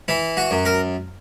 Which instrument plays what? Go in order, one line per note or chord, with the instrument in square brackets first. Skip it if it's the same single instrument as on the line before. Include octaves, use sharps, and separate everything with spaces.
[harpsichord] E3 E4
F#4
F#2
A#4